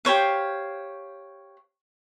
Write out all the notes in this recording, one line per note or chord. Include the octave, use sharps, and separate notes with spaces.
G4 C5 C#5 F5